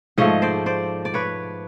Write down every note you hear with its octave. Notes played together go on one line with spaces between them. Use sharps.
G#2 F3 A3 C#5 D#5
C5 D5
C5 D5
D5
B4 C#5